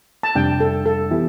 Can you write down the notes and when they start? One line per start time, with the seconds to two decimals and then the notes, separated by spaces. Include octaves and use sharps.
0.23 A5
0.35 F2 C3 G3 D4 G5
0.60 A4
0.86 A4
1.11 E3 B3 E4 G4